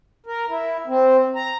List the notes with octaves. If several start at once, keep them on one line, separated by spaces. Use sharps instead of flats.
A#4
E4
C4
A#5